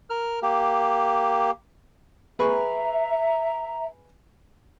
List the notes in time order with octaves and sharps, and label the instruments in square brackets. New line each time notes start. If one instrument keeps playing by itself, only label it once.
[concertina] A#4 F6
A#3 G4
[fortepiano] G#4 B4 C#6 [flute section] E5 A#5